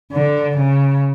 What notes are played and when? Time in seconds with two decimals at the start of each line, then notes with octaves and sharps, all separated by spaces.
0.12 D3
0.58 C#3